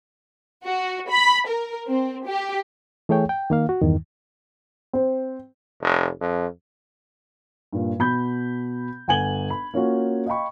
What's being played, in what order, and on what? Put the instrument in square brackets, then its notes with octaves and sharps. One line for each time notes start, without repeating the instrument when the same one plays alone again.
[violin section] F#4
B5
A#4
C4
G4
[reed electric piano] E3 A3 G#4 C#5 G5
G5
D#3 A#3 F5
F#4
E2 G2 D#3
[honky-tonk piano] C4
[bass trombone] F1
F2
[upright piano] G2 A#2
B2 B5 G6
G1 F#5 G#5 G#6 F#7 G7
B5
A#3 C#4 F4 F#4
D#5 F5 G5 B5 C#6